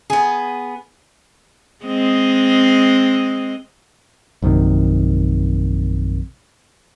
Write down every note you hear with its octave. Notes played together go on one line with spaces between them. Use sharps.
B3 G#4
G#3 C4 D#5
A#1 F#2 C3 D#3